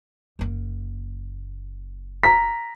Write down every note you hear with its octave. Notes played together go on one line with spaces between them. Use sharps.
F#1 A#3
A#5 B6